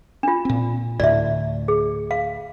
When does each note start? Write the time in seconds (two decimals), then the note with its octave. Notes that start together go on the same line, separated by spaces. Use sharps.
0.23 D4 F4
0.45 A#2 C4
1.00 D2 A2 D5 E5
1.68 G#4
2.11 F5